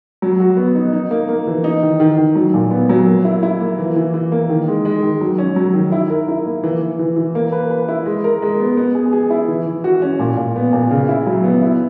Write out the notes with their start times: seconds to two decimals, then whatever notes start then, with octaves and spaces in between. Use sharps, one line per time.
0.22 F#3
0.40 F#4
0.57 B3
0.75 D#4
0.93 D#4
1.11 A#3
1.29 A#3
1.47 E3
1.64 D#4
1.82 D#3
2.00 D#3
2.18 D#3
2.35 F#3
2.54 A#2
2.71 B3
2.89 F#3
3.07 A#3
3.25 E4
3.43 E4
3.60 A#3
3.78 E3
3.96 E3
4.14 E3
4.32 A#3
4.49 D#3
4.68 G#3
4.85 G#3
5.02 D#3
5.21 F#3
5.38 C#4
5.56 F#3
5.74 D#3
5.92 E4
6.10 A#4
6.28 E4
6.46 A#3
6.64 E3
6.81 E3
6.99 E3
7.16 E3
7.35 A#3
7.52 B4
7.71 B4
7.88 E4
8.05 G#3
8.24 A#4
8.42 G#3
8.60 B3
8.77 B3
8.95 G#4
9.13 G#4
9.30 E4
9.48 E3
9.67 E3
9.84 F#4
10.02 C#4
10.19 A#2
10.37 A#2
10.56 B3
10.73 A#2
10.91 C#3
11.09 E4
11.26 F#3
11.44 B3
11.62 E4